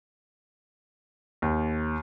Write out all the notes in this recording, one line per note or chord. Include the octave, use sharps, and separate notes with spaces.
D#2